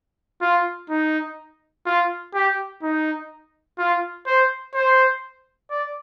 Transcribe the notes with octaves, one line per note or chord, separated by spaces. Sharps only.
F4
D#4
F4
G4
D#4
F4
C5
C5
D5